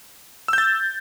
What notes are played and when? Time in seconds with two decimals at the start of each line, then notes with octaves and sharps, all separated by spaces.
0.48 E6
0.53 G6
0.58 A6